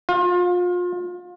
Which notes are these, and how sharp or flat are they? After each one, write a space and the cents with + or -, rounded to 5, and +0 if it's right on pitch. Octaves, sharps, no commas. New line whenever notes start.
F4 +30